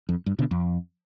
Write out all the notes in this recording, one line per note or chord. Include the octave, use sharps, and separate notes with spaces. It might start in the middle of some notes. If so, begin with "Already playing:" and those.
F2
G2
B2 D3
F2